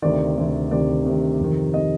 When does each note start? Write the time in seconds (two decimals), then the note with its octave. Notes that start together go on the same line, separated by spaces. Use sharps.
0.02 D2 C3 D#3 D5
0.37 D2 C3 D#3
0.71 D2 C3 D#3 D5
1.05 D2 C3 D#3
1.40 F2 C3 D#3
1.74 C3 D#3 D#5